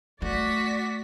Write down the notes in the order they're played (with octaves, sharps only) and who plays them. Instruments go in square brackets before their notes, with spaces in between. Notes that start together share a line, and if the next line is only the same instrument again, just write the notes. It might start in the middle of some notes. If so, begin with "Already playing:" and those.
[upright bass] A3 [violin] F#4 B6 [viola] D5